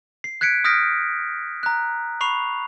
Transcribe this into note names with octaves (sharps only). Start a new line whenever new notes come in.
C7
F#6 G#6 B6 C#7 D7
D#6 F6 G6 A#6 B6 D7
A#5 F#6
B5 C#6 C7 F7